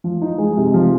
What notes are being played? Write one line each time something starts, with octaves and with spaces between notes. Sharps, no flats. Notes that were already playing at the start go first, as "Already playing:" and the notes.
F3
D#4
G#3
C3
F3